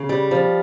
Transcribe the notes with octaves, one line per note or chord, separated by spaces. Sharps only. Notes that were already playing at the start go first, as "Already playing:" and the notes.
Already playing: C#3
G3
F3